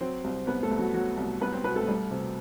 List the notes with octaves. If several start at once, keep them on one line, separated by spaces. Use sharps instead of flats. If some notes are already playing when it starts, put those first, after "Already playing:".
F#3 C4 C5
C2
C2 B3 B4
A3 A4
C2
F#3 F#4
F#3 F#4
C2
C2 B3 B4
C4 C5
B2 B3 B4
A3 A4
G3
C3